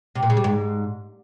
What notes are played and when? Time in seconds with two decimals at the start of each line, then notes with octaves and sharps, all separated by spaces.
0.15 C3
0.23 A#2
0.30 C#3
0.37 G3
0.44 G#2